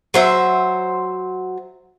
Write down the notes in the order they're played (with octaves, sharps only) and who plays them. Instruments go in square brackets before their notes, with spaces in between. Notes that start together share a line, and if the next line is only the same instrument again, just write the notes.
[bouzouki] F#3 C5 E5